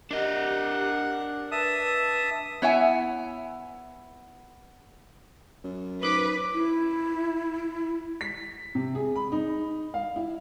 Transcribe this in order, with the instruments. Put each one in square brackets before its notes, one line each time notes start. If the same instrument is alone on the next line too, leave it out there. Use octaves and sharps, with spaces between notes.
[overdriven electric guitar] D4 D#5 [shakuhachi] G4 [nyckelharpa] A#4 F#5
[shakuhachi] B4 [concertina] E5 A5 D#6
[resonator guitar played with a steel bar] B3 E4 C#5 E5 F#5 G#5
[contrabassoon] F#2
[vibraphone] D#4 C5 [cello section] B4 [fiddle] D6
[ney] E4
[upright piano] B6
C3
G#4
B5
D#4
F5
E4